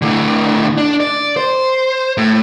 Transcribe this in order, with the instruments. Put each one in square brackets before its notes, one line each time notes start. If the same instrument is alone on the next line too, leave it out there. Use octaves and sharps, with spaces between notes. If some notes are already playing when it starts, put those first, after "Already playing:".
[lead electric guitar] A2 D3
D4
D5
C5
A2